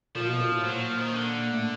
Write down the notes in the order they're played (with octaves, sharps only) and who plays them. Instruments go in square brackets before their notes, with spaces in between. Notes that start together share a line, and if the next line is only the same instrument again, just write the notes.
[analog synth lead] A#2 [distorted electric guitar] F3
[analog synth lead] B2
A#2
A2
[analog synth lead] A#2 [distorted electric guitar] F#3
[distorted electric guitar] F3
D#3
D3
[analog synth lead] A2